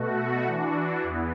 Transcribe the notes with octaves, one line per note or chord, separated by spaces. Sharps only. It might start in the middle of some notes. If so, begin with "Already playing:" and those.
Already playing: B2 A3 F#4
E3 D4 F#4
E2 E3 B3